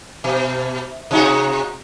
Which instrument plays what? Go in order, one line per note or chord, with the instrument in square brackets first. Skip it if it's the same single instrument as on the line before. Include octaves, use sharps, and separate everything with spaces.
[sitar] B2
C3 D#4 F#4